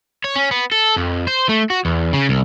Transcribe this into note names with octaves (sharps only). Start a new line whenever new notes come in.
C#5
C#4
B3
A4
F2
C5
A3
F#4
E2
C#3
C2